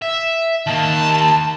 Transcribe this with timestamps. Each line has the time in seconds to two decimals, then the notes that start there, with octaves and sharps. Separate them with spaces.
0.02 E5
0.67 D#3 A#3 A5